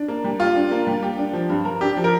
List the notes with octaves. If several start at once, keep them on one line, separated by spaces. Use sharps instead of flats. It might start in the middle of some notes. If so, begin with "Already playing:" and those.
Already playing: D4
A#3
G3
F4 G4
D4
A#3
G3
G4
D4
F3
G2
A#4
D4 G4
F3
A#4